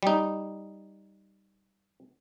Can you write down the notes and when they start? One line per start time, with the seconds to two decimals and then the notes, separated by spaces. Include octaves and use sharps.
0.03 G3 D#4